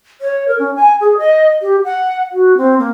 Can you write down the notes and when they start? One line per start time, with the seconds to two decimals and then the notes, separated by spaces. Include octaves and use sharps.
0.21 C#5
0.48 A#4
0.59 C#4
0.76 G#5
1.01 G#4
1.18 D#5
1.62 G4
1.85 F#5
2.32 F#4
2.57 C4
2.79 A#3